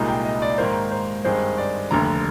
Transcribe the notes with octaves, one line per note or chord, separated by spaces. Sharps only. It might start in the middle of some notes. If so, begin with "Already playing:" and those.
Already playing: C2 A#2 G#3 D#4
G5
D#5
D5
G#2 D#3 A#3 C5
C5
G2 D#3 G#3 C4 C5
D5
F1 D#2 D3 A#5